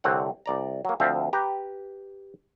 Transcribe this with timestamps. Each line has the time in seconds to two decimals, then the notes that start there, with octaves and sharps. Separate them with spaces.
0.04 C2 D3 C4 C#5 F#5
0.46 C2 D5 A#5
0.85 F#3 A#3
1.00 D2 F3 C4 E5 F5
1.33 G4 B4 A#5